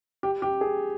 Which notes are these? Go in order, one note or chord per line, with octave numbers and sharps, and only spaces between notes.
G4
G4
G#4